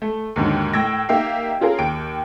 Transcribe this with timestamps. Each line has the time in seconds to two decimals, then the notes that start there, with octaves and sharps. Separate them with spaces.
0.02 A3
0.36 D#2 G#2 D3 F#3
0.73 A2 G5 E6 G#6 A#6
1.09 A#3 D#4 G4 E5 F5 G5
1.61 C#4 F4 G#4 A#4
1.78 D#2 G5 D7